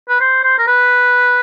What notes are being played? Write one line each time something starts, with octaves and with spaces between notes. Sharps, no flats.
B4
C5
C5
A#4
B4